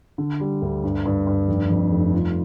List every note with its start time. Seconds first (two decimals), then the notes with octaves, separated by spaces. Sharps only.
0.18 D3
0.40 G3
0.62 D2
0.84 G2
1.06 G2
1.27 G2
1.48 F1
1.70 F2
1.92 F1
2.13 F4